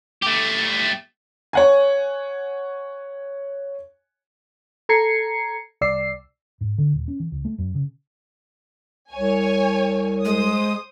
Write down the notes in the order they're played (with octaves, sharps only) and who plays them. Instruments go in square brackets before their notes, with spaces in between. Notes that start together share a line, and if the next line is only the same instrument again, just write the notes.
[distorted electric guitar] A3 G4
[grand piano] C#5 F#5 G#5
[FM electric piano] A4 A#5 G#6 C7 C#7
C2 D5 E6 C7
[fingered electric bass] G#2
D3
D#1
C#4
E3
C#2
A3
F#2
C#3
[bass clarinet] C2 [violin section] C#5 G#5
[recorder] G#3 [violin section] C5 D#6